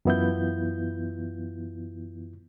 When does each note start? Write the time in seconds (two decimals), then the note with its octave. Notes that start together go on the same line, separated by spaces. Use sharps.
0.05 F#2 E3 B3 E4 F4 G6